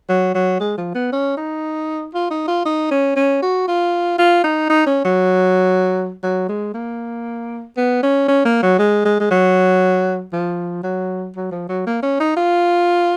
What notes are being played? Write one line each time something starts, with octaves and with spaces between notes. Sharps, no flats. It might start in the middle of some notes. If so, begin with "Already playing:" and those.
F#3
F#3
G#3
F3
B3
C#4
D#4
F4
D#4
F4
D#4
C#4
C#4
F#4
F4
F4
D#4
D#4
C#4
F#3
F#3
G#3
A#3
B3
C#4
C#4
A#3
F#3
G#3
G#3
G#3
F#3
F3
F#3
F#3
F3
F#3
A#3
C#4
D#4
F4